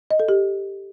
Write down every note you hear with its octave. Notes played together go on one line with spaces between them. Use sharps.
D#5
A4
G4